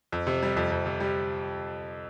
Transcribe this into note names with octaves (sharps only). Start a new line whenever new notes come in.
F2
C3
G3
F2
F2
C3
G3